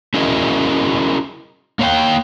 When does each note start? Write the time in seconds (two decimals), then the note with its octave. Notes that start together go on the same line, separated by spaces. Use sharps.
0.14 C#4 E4 F#4 G#4 A#4 D#5
1.79 A#3 C#5 F5 G5